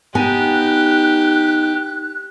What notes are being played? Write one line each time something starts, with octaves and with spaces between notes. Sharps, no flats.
B3 D#4 G4 G#5 F#6